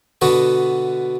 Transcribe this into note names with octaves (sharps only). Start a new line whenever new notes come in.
B2 D3 B3 F#4 A4